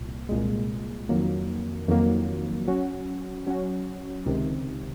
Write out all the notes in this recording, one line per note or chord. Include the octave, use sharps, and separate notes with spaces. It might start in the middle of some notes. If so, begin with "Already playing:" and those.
Already playing: C2 A#2
C2 A#2 G#3
F2 D#3 F#3 A#3
F2 D#3 F#3 A#3
F#3 C#4 F#4
F#3 C#4 F#4
C#2 C3 D#3